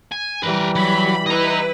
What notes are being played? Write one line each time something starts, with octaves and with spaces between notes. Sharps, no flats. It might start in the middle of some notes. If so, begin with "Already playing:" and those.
G#5
E3 G3 A#4 B4
F#3 B5
E4 B4 D#5 A#5